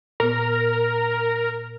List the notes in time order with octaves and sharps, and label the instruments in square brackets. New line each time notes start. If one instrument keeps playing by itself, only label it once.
[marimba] A#2 B3 [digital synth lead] A#4